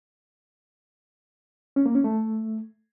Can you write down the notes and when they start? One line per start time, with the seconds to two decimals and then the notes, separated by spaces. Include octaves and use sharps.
1.76 C#4
1.86 A#3
1.95 C#4
2.04 A3